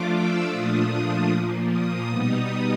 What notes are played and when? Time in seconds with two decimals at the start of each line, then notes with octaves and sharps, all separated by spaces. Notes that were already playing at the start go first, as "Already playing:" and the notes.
Already playing: F3 A3 D4 F4 D6
0.12 E6
0.51 A#2 F3 A3 D4 F4 D#6
0.90 D#6
1.29 A#2 F3 A#3
1.69 D#6
2.09 B2 G3 B3 D#4